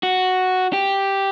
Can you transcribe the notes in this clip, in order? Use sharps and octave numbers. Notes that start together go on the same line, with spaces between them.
F#4
G4